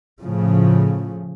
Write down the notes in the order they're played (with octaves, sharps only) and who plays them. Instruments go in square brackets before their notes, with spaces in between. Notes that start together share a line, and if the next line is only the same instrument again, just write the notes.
[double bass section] A2 C#3 F3